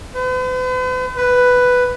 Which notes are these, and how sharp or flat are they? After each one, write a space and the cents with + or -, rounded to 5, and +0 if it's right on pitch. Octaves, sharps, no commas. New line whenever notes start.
B4 +45
B4 +5